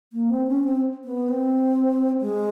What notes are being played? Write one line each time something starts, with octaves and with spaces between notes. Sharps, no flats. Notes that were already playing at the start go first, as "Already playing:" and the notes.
A#3
C4
C#4
C4
B3
C4
G#3